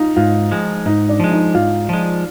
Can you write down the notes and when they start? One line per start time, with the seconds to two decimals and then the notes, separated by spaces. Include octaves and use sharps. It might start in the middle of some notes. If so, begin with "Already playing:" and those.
Already playing: D#4 F4
0.16 G#2 F4
0.51 F3 G#3
0.86 G#2 D#4
1.09 D4
1.20 F3 G#3
1.32 D#4
1.55 G#2 F4
1.89 F3 G#3